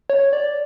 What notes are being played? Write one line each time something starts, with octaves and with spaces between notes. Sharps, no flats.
C#5
D5